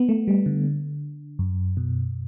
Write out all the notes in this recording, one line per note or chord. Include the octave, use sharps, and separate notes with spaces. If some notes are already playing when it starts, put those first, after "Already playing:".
Already playing: B3
A3
G3
D3
F#2
B2